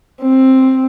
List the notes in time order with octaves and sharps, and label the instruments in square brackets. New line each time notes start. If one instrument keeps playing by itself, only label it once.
[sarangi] C4